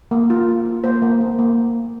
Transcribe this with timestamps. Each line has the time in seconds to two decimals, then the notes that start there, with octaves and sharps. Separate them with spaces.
0.11 A#3
0.30 F4
0.48 A#3
0.65 F4
0.84 A#3 C5
1.02 A#3
1.21 A#3
1.39 A#3